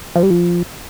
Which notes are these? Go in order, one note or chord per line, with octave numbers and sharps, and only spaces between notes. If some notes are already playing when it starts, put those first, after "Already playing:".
F3
G3
F3